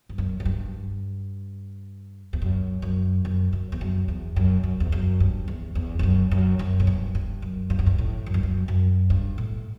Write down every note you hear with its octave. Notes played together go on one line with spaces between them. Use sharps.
G2
F#2
F#2
G2
E2
F#2
F#2
F#2
F#2
E2
F#2
E2
F#2
F#2
E2
F#2
G2
E2
E2
E2
F#2
F#2
F#2
A2
G2
G2
F#2
G2
F#2
G2
A2
F#2
G2
F#2
F#2
G2
A2